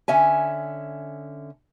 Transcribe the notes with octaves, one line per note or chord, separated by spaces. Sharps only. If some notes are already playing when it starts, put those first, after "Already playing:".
D3 C#4 E5 G#5